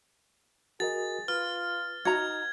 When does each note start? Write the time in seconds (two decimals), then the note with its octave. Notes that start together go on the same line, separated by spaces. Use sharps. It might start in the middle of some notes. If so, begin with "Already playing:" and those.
0.80 F#4 G#4 A#4 D#5 A6
1.28 F4 B4 F6
2.05 D#4 F#4 A#5 G#6